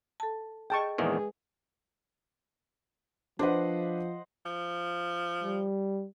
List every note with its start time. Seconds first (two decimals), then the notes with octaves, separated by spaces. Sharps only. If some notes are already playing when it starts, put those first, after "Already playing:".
0.20 A4 A5
0.70 G#4 D#5 G5 A5 C#6
0.98 A#1 E2 D#3 G#3 G#4 B4
3.39 F3 D4 B4 C5 D#5 F#5
4.46 F3
5.43 G3